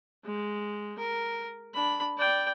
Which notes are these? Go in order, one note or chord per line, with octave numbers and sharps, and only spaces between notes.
G#3
A#4
D4 B5
D5 G5